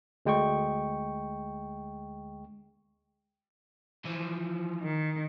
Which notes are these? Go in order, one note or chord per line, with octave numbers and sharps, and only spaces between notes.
D2 G#3 G5 C#6
E3 F3
D#3